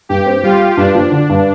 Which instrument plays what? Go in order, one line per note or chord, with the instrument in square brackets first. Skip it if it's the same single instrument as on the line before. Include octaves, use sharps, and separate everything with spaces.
[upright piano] G2 [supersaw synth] G4
[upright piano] C4
[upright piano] G3 [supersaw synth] F4
[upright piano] G4
[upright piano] G2 [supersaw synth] D4
[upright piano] F3
D3
G2